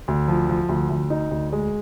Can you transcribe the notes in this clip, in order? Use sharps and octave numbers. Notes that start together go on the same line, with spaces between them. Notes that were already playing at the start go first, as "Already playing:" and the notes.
D2
F3
F3
D2
D2
D#4
D2
G#3